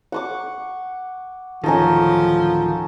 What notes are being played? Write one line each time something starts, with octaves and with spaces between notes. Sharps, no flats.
F#5 C#6 D6
D1 D#3 F3 C#4 D#4 A4